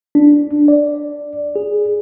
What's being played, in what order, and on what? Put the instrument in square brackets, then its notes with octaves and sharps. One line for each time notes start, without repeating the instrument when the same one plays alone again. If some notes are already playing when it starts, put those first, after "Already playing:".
[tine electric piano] D4
D5
G#4